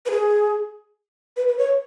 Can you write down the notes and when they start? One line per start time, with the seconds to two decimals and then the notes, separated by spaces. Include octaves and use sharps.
0.06 B4
0.11 G#4
1.37 B4
1.48 B4
1.58 C#5